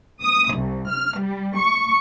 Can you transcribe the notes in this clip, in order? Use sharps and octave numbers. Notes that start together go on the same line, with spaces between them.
D#6
C2
F6
G3
C#6